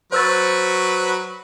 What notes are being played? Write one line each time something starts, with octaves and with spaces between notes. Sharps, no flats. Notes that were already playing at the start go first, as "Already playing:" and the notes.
F#3 B4 C5 C#6 E6 A6